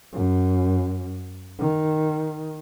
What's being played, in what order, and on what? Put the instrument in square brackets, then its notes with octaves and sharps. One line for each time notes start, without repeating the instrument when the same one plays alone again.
[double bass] F#2
D#3